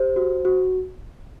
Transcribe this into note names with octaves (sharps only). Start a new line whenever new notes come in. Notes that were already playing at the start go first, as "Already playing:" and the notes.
Already playing: G4 C5
F#4
F#4